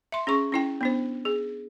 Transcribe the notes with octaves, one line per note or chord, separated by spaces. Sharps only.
E5 C6
C#4 G#4 C#6
C#4 E4 G5
B3 D4 C5
G#4